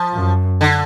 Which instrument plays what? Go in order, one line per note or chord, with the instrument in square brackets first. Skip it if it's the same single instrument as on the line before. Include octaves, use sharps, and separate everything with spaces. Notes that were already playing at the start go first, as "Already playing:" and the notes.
Already playing: [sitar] F3
[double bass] F#2
[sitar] D3